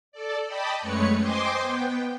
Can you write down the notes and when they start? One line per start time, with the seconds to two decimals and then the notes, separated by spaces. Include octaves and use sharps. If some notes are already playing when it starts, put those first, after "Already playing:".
0.12 A4 D5
0.47 D5 D#5 G5 A5 B5
0.80 F#2 G#3 A3 B4 C#5 C#7
1.17 C5 D#5 G5 G#5 C6 D6
1.61 B3 G5